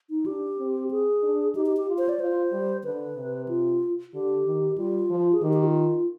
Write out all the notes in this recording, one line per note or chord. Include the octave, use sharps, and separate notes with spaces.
D#4
D4 G4
C4
G#4
D4
D#4 G4
G4
G4
F4
C5
D5
F4 C5
G3
D3 B4
C3
F4
D3 G4
D#3
G3 F4
F3
G#4
D#3 G4
G4
F4